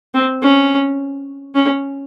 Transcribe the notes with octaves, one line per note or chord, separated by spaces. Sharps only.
C4
C#4
C#4